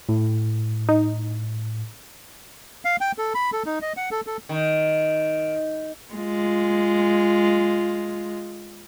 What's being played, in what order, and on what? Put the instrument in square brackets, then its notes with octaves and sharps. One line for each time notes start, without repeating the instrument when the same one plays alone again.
[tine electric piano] A2
[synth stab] D#4
[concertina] F5
G5
A4
B5
A4
D#4
D#5
F#5
A4
A4
[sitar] D#3
[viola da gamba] G#3 F4